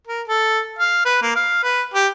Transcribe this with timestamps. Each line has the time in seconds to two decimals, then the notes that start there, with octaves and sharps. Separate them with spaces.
0.07 A#4
0.28 A4
0.79 F5
1.05 B4
1.22 A#3
1.36 F5
1.63 B4
1.94 G4